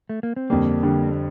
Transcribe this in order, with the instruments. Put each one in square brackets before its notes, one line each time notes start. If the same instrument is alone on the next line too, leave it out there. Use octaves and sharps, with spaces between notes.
[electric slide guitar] A3
A#3
C4
[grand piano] F2 D3 G3 [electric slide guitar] A#3 D4
[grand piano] D3 G3